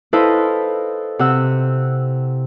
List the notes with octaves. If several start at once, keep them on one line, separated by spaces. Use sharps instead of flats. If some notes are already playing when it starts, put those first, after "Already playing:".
E4 A4 B4 C5 D#5 F5
C3 F#5 E6